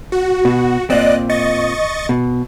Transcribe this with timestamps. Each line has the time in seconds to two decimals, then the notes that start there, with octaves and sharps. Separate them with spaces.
0.12 F#4
0.45 B2
0.90 A#2 C4 D5 D#5 F#6
1.29 D#5 C#6 A6
2.09 B2